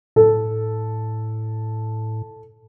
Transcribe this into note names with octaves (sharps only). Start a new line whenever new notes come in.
A2 A4